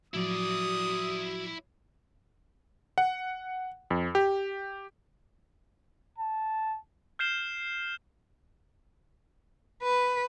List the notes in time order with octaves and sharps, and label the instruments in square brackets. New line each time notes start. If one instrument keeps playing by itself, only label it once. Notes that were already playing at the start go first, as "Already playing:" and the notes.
[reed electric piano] A2 F3 F#3 [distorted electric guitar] E4 D5 [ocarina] F#4 [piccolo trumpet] D#6
[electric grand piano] F#5
F2
G4
[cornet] A5
[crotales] F6 G6 C7 E7 G7
[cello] B4